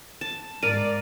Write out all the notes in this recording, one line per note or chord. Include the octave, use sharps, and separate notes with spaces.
A5
G#2 A#4 D5 F5 D#7